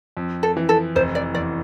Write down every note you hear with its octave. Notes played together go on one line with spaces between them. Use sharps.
F2
A4
E3
A4
F1 C5
D5
E2 D5